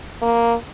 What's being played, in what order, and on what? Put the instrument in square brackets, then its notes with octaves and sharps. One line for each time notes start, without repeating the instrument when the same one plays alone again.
[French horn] A#3